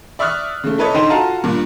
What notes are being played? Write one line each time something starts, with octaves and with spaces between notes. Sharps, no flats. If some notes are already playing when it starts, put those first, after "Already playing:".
D5 E5 C#6 D#6 F6 F#6
C#3 A3
E4 A4 B4 C#5 D#5
D3 D#4 C5 D#5 G5 D#7
F4 F#4 A4 F5 A5 A#5
G2 A#2